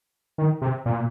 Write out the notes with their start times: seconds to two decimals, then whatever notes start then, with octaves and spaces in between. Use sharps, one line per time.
0.38 D#3
0.62 C3
0.86 A#2